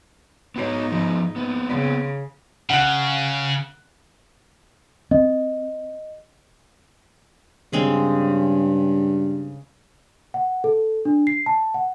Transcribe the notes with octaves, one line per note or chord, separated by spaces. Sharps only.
G#2 B3 D#4 F#4 C#5
F3 B3
B3 C4
C#3
C#3 F#5 F#6
C4 D#5
G2 C#3 G#3 C4
F#5
A4
D4
C7
A5
F#5